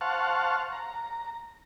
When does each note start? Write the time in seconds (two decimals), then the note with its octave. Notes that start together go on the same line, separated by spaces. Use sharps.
0.01 C5 F5 F#5 A5 C#6
0.73 A#5